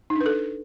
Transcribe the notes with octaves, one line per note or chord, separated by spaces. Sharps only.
D#4
D4
B4
A4